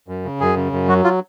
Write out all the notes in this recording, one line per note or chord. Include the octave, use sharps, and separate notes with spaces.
F#2
C#3
F#2 G#4
C#3
F#2
F#3 F#4
F4